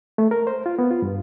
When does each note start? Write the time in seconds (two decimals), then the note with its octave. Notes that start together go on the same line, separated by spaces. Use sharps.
0.18 A3
0.31 A#4
0.47 C5
0.66 F4
0.79 B3
0.91 F4
1.02 G2